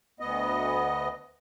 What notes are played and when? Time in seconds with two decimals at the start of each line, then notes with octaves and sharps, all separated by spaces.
0.20 D2 B3 D#5